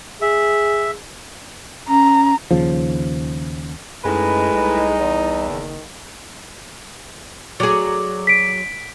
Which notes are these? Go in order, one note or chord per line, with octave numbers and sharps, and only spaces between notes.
G#4 E5
C#4 A#5
D#2 C#3 F3
F#2 A2 G#3 D#4 B4
C2 D#4
E2
F#1 D#3
F#3 G#4 D5 D6
B6 D7